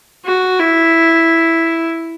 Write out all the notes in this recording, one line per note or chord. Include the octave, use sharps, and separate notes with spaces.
F#4
E4